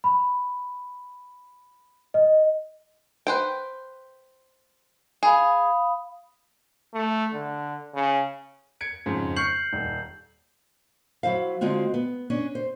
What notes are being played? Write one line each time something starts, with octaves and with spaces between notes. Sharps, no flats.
B5
D#5
B4 C5 G5
G#4 F5 B5 D#6
A3
D3
C#3
G#6 C#7 D7
F2 G#2 C#3
C#6 F6 G6 C7 C#7 F#7
D#1
F#3 E4 C5 F5
D3 G#3 C4 F4 F#4
B3
C#4 D4
C5